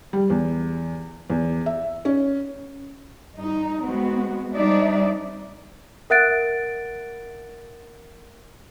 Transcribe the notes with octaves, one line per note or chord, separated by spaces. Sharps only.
G3
E2
E2
E5
C#4
G2 D#4
G#3 B3 C4 F#4
G3 C4 D4 D#4 D5 E5
A#4 E5 F#5 F#6 A6 D7